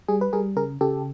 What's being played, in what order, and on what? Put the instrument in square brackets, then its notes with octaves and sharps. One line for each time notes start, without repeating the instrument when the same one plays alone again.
[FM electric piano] G3 G#4
B4
G3 G#4 A#4
C#3 G#4 A#4
C#3 G4 A4